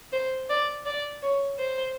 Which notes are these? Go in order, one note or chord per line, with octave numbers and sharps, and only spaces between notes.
C5
D5
D5
C#5
C5